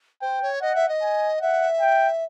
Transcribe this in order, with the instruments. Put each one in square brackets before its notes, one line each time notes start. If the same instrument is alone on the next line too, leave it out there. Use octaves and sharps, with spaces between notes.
[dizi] C5 [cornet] G5
[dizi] C#5
[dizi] D#5 [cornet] F#5
[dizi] E5
D#5
[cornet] G#5
[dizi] E5 [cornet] F#5
[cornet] G5